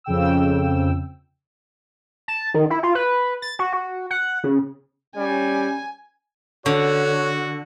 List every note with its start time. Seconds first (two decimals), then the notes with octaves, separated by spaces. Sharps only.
0.04 F2 C#3 G5 E6
2.28 A5
2.54 D#3
2.70 E4
2.83 F4
2.95 B4
3.42 A6
3.59 F#4
3.73 F#4
4.10 F#5
4.44 C#3
5.17 G3 C#4 G#5
6.66 D3 F#4 C#5